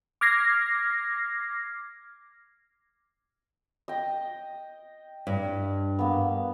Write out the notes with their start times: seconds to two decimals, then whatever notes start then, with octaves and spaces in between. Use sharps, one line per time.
0.21 D6 F6 G#6 A#6 C7
3.88 D#5 G5
5.27 G2
5.99 A#3 B3